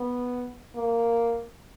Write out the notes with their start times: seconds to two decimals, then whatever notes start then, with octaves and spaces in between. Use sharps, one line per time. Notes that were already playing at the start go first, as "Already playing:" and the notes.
Already playing: B3
0.76 A#3